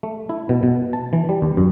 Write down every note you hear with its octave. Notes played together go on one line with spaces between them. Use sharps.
A3
E4
B2
B2
A5
E3
G3
D#2
F#2